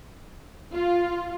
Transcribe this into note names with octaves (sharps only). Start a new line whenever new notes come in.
F4